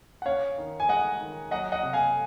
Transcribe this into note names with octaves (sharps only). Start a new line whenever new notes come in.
F#5
C#4 C#5 F5
D#3
G#5
G#3 D#5 F#5
D#3
F#3 D#5 F#5
D#5 F#5
C3
F5 G#5